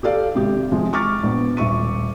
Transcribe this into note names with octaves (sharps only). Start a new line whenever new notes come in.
G4 A4 D5 F5
G#1 C3 G4
C3 F3 G#3
C#6 D6 F6 A6
A#1 B3
D#1 E5 C#6 D#7